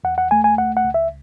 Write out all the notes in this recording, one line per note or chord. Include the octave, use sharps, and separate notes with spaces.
E2 F#5
F#5
A3 G#5
G#5
C#2 F#5
F#5
C#2
E5